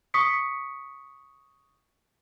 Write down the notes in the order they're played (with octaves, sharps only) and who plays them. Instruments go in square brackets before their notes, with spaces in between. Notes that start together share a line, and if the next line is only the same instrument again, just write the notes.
[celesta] C#6 D#6 B6 C#7